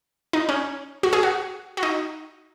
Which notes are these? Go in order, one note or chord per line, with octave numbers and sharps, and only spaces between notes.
D#4
C#4
F#4
G#4
F#4
F#4
D#4